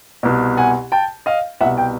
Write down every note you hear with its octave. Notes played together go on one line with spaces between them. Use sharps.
C2 B2
F#5 G#5
G5 A5
D#5 F5
C2 B2 E5 F#5
G5